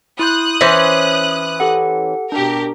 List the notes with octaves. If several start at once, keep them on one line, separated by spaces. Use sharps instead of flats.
E4 C6 D#6 F#6 G6
E3 C#4 C5 E5
G4 A4 F#5
B2 D4 G4 A#4